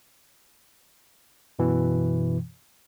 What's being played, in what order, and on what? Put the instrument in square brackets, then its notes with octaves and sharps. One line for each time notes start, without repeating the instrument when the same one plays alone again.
[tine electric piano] F#2 B2 E3